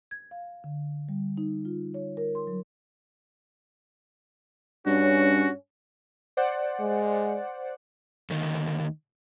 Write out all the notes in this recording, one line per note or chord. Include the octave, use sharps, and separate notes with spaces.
G#6
F5
D3
G3
D#4
F4
C#5
A#4
C6
F#3
G2 C#4 F#4
C5 D5 F#5
G#3
D2 D#3